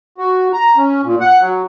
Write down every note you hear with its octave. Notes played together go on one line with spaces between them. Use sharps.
F#4
A#5
C#4
A#2
F#5
F#3